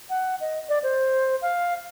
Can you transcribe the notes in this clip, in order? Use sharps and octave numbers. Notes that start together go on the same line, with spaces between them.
F#5
D#5
D5
C5
F5